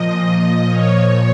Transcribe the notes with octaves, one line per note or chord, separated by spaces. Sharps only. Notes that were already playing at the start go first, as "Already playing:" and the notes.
Already playing: A#2 F3 D#5
D#5
A#2 F3 C#5